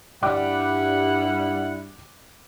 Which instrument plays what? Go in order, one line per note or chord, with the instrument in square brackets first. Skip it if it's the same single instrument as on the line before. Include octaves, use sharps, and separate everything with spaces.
[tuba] G2 [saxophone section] G3 [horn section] E4 F#5 [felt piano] G5 D6 F#6